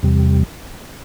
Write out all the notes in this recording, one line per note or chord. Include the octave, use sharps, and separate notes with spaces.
E2 C3 G3